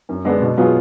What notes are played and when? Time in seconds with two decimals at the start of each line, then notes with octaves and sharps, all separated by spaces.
0.09 F#2
0.25 D3 G#3 B3 D4
0.41 B2
0.57 F#3 B3 F4 G#4